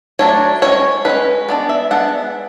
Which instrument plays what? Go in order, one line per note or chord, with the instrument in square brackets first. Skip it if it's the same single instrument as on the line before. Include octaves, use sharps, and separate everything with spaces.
[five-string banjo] F#3 A3 D4 C#5
G#3 C#4 C#5
G#3 C#4 B4
G#3 B3 D4 D5
E5
G#3 B3 D4 F#5